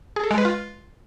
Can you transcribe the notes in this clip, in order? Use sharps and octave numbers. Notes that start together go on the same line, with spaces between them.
G#4
A4
G#3
B4
F4